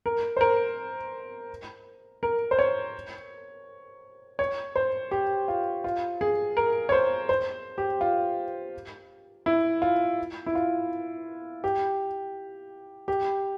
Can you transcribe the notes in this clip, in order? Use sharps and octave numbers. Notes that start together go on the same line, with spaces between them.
A#4
C5
A#4
A#4
C5
C#5
C#5
C5
G4
F4
F4
G#4
A#4
C#5
C5
C5
G4
F4
E4
F4
E4
F4
G4
G4